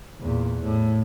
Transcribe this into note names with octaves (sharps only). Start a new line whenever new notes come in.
E2 A#2
A2